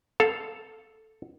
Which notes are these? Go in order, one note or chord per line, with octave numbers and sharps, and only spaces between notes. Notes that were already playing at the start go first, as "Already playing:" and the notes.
A4 F5